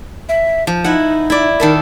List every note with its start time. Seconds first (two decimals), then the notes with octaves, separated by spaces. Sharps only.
0.29 E5
0.67 F3
0.84 D#4 E4 F#5
1.30 E4 D5
1.60 D#3 A4 A#4 E5